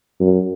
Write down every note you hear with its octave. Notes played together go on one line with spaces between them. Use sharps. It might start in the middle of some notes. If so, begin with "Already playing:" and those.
F#2